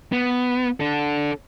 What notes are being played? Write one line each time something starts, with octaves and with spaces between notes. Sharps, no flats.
B3
D4 A4